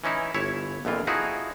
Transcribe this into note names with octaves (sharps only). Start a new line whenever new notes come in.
E3 C#4 D#4 E4
G1 E4 C#5 E5
A#1 F2 E3 F4
F3 D#4 E4 F#4 G#4